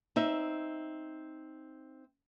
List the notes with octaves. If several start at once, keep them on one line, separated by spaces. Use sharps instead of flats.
C4 D#4 E5